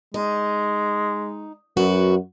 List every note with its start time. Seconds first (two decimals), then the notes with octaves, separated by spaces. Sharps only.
0.14 G#3 D#4
1.77 F#2 F#4 B4